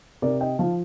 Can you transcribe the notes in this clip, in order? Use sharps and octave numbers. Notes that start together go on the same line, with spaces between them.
C3 A#4 D5
D#5 G5
F3 F5 A5